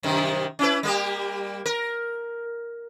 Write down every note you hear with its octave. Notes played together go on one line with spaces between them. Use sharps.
F#2 C3 D#3
C#4 E4 B4
G3 A#3 G4
A#4